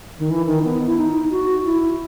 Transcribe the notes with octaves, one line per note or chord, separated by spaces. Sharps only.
D#3
E3
D#3
B3
E4
D#4
F#4
E4